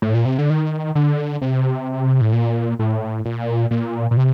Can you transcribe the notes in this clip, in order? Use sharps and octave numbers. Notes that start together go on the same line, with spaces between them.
A2
A#2
C3
D3
D#3
D3
C3
A2
A#2
A2
A#2
A#2
A#2
C3